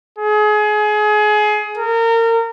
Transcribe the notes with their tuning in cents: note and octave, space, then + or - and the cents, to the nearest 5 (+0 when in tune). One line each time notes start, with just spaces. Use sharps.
G#4 +25
A#4 -30